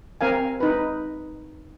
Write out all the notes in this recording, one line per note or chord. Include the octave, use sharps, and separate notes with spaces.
C4 A#4 F5 G#5
D#4 B4